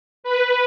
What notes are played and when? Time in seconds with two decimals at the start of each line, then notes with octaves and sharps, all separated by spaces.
0.24 B4